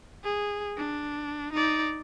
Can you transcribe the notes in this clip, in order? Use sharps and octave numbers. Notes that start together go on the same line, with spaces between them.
G#4
D4
D#4 D5